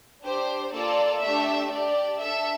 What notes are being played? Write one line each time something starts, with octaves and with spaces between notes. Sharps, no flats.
D4 G4 C5
A#3 F4 A4 D5
A3 D4 G4 E5
D4 G4 D5
D4 A4 E5